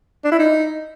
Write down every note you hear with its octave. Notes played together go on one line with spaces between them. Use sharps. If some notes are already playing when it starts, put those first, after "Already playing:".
D4
E4
D#4